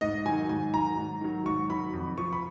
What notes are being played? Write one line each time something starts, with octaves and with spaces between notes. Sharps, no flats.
G#2 D#5
D#3 F#3 G#5
G#2 G#5
D#3 F#3 A#5
G#2
D#3 F#3
G#2 C#6
D#3 F#3 B5
F2
F3 C#6
B5